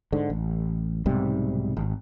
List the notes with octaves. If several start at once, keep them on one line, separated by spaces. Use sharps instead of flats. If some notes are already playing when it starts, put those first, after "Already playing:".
G#2 D3
A1
B1 G#2 C3 G3
G#1